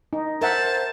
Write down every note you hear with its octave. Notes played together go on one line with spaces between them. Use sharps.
D#4
A#4 C5 E5 F#5 A5